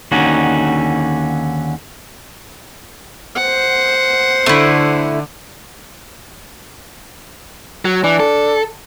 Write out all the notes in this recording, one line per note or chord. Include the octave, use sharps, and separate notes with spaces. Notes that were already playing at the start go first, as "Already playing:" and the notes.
D#2 D3 C#4 D#4 F#4
C5 F#5
D3 A3 E4
F#3
E3 D4
A4